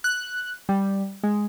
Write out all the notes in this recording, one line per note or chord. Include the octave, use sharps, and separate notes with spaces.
F#6
G3
G#3